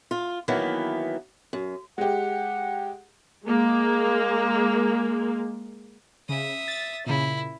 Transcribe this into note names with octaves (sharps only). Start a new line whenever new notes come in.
F4
D#3 E3 F#3 A#3 B3
F#2
G#3 G4 F#5
G#3 A#3
C#3 E5 D#6
A6
A#2 C#3 E4